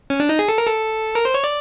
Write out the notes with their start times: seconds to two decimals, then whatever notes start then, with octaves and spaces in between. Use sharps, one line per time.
0.10 C#4
0.20 D4
0.29 D#4
0.39 G#4
0.49 A4
0.58 A#4
0.67 A4
1.15 A#4
1.25 C5
1.34 C#5
1.44 D5